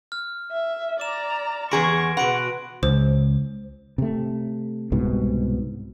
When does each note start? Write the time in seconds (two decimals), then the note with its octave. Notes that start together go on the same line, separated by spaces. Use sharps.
0.12 F6
0.52 E5
1.00 D5 A#5 D6 E7
1.71 E2 G#4 A#5 C6 C#6 A#6 D7
2.17 B2 F#4 B4 F#5 B5 C6 D7
2.83 C#2 C5
3.98 C3 A3
4.92 C2 G#2 B2